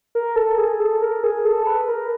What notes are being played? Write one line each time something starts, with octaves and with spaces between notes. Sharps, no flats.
A#4
A4
G#4
A4
A#4
G#4
A4
B4
A#4